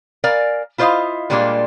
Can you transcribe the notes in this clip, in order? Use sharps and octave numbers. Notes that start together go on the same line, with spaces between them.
A#4 D5 F5 G#5
E4 F4 C5 C#5 D#5 F5
A#2 G3 G#3 A#3 D4 F4